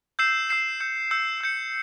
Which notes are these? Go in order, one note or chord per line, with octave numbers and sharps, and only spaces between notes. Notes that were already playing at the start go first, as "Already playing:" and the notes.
E6 G6 C7 E7
E6 G6 C7 E7
E6 G6 C#7
E6 G6 C#7
E6 G6 C#7